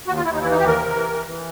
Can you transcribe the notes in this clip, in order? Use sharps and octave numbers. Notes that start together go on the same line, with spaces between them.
D#2 F#4
F4
D#2 E4
D#4
E3 E4
D#4
D#2 G4
A#4
C3
E3
E3
E3